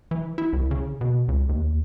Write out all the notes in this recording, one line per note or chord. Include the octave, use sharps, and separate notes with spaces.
E3
E4
C2
C#3
B2
C#2
D#2